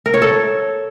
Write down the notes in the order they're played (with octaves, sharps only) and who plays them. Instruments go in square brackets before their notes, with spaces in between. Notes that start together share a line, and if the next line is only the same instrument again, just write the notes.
[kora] A#4
C#5
A4